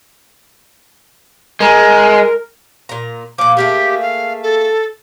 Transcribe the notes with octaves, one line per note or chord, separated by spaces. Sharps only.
G#3 A#4
A#2 A#5
A#2 F3 D6
A3 A#3 G4 G#4
F5
A4